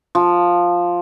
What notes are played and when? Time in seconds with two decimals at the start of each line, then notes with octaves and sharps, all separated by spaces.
0.15 F3